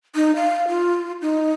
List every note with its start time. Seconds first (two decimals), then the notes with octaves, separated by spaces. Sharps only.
0.15 D#4
0.36 F5
0.68 F4
1.22 D#4